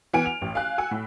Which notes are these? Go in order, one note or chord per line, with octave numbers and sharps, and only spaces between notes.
E3 B3 F#5 G#5 F6 D7
F7
A1
F5 G#5 F#6
F#5 G#5 E6
A2